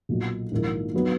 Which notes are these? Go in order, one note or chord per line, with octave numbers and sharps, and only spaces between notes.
B1 A#2 F#3
A#1 G#2 D#3 A#3 E4
F#3 B3 D#4